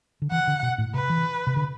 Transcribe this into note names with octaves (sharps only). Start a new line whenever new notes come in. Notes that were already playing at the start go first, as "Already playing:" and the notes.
D3
E3 F#5
D3
B2
A2
C3 B4
E3
C3
D3